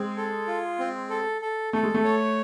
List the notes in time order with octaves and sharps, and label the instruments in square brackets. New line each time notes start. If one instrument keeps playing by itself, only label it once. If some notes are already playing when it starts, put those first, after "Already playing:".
Already playing: [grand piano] G#3 [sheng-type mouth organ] C4
[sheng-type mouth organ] A4
F4
C4
A4
A4
[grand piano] A3 [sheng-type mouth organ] A4
[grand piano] G#3
A3
[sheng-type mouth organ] C#5